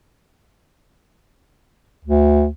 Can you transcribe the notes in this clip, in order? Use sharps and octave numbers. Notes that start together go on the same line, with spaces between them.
D2